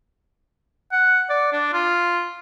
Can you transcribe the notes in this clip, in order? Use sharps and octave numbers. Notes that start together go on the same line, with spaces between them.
F#5
D5
D4
F4